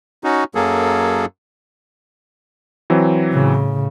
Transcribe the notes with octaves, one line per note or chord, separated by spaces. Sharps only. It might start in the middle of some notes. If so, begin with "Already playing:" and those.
C#4 D#4 F#4
F#2 F#3 A#3 G#4 A4
E3 F#3 C4
A2 C#3